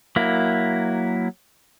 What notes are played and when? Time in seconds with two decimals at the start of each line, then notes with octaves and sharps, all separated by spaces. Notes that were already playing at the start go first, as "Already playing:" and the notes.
0.16 F#3 A#3 E4